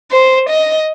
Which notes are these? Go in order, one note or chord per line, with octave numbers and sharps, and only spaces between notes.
C5
D#5